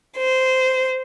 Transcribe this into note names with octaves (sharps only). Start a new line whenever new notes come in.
C5